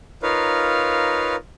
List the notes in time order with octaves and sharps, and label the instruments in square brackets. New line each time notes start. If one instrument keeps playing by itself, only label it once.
[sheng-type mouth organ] D#4 F4 A#4 B4 C#5 F5